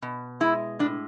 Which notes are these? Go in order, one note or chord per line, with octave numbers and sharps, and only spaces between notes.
B2
G#3 E4
A2 D4